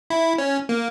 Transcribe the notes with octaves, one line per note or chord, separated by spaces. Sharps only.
E4
C#4
A#3